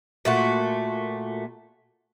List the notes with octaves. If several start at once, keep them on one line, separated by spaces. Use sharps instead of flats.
A#2 A3 F#4